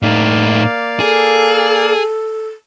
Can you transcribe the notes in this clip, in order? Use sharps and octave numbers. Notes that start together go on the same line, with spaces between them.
A2 A#3 D#4 D5 F5
G#4 A4